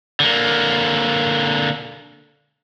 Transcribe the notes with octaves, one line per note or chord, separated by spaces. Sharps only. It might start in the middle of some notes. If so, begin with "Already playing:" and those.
D3 A#3